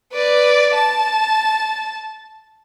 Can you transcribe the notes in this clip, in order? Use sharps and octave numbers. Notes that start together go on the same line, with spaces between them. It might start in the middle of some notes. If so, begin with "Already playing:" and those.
B4 D5
A5